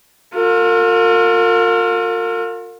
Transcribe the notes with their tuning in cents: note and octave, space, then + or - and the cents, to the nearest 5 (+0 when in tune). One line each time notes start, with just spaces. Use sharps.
F4 +35 A#4 -40